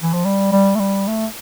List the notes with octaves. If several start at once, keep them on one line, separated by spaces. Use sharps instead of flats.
E3
F3
G3
G3
A3
G3
A3